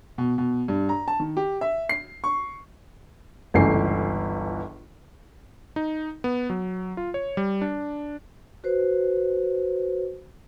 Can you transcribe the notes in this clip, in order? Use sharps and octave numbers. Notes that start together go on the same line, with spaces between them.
B2
B2
G2
A#5
A5
D#3
G4
E5
C7
C#6
G1 C#2 E3 A3 G#5 C7
D#4
B3
F#3
F4
C#5
G3
D4
F#4 B4 C5